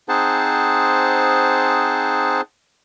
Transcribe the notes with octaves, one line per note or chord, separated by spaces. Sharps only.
C4 D#4 G#4 C5 F#5 A5